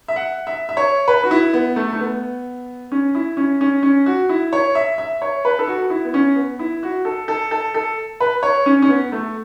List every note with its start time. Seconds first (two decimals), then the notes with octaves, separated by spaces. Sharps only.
0.08 E5
0.16 F#5
0.47 E5
0.69 E5
0.77 C#5
1.08 B4
1.23 F#4
1.31 E4
1.53 B3
1.76 A3
1.93 A3
2.00 B3
2.92 C#4
3.15 E4
3.37 C#4
3.61 C#4
3.83 C#4
4.06 F#4
4.29 E4
4.53 C#5
4.75 E5
4.98 E5
5.22 C#5
5.45 B4
5.59 A4
5.67 F#4
5.90 E4
6.05 B3
6.14 C#4
6.36 B3
6.59 E4
6.83 F#4
7.05 A4
7.28 A4
7.51 A4
7.74 A4
8.20 B4
8.43 C#5
8.66 C#4
8.82 C#4
8.89 B3
9.12 A3